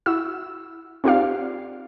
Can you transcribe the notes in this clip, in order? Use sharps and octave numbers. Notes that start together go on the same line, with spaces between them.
E4 F#4 E6
C4 D#4 F4 G4 D5 F5